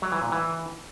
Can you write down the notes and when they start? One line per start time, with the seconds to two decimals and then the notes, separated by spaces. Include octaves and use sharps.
0.02 F#3
0.12 E3
0.22 A#2
0.32 E3